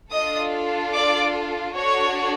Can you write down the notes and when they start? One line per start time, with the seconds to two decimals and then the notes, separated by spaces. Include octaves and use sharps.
0.12 D4 F4 A4 D#5 D#6
0.94 D5 D6
1.75 D4 F#4 A4 C#5 C#6